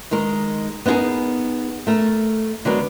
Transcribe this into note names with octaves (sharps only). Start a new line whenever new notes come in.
D#3 G#3 A#4
B3 D#4 E4 G#4 A#4
A3 A#4
D3 F#3 G#3 B3 F#4 A#4